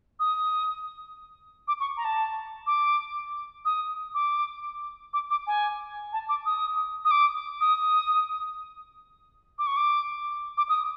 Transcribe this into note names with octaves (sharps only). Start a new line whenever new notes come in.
D#6
D6
C#6
A#5
A5
D6
D#6
D6
D6
D6
G#5
A5
D6
D#6
D#6
D6
D#6
D6
C#6
D6
D6
D#6